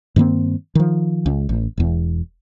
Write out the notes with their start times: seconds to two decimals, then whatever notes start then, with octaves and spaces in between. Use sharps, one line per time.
0.16 G2 D#3 A#3 C4
0.75 D#3 F3
1.26 C#2
1.49 A1
1.78 E1 E2